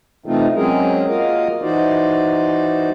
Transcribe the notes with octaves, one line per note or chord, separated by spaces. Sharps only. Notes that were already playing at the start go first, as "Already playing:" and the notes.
C3 E3 A3 C4 D#4 F4
F#3 G#3 C4 C#4 G#4 A#4
A#3 F4 F#4 A#4 D#5 F5
E3 D#4 F#4 C5 D5